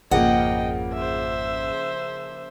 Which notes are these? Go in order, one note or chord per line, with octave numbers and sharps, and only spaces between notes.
G#1 F2 C#3 F3 A#3 D#5 F#5 G5
C5 E5